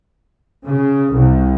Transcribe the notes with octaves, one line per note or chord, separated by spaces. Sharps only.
C#3
C2